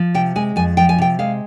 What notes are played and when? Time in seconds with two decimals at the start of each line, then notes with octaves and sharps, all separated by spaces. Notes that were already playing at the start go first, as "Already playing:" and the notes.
Already playing: F3
0.14 C3 G5
0.36 G#3 G#5
0.56 F2 G#5
0.77 F3 G5
0.89 G#5
0.98 C3 G5
1.19 G#3 F5